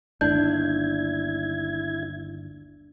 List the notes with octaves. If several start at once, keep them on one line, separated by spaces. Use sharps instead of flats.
G1 D#2 D4 E4 G6 G#6